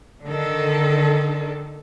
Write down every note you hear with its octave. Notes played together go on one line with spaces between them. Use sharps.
D3 D#3 D4 A4